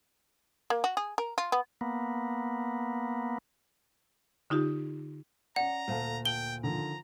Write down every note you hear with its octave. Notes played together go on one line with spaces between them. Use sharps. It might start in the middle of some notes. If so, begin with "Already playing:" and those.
A#3
F#4
G#4
A#4
F4
B3
A#3 B3
D3 D#4 F4 G4
C#4 D5 F#5 A#5
D2 A#2 A4 F5 A5
G5 A5 D7 F#7 G7
D3 D#3 F3 A#5